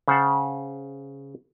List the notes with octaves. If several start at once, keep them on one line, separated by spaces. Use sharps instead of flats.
C#3 C5 F#5 A5